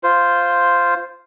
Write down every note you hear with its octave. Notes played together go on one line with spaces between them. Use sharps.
F4 C5